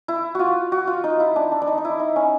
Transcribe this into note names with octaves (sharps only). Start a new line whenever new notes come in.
E4
F4 F#4
F#4
F4
D#4
E4
D4
D4
D4
D#4
D#4
E4
D#4
C#4